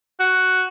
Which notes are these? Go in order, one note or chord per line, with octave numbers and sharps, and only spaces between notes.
F#4